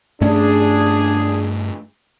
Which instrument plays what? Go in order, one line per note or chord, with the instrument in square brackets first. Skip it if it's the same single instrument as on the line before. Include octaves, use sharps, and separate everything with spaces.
[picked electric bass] G2 A3 C#4 [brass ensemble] D4 G#4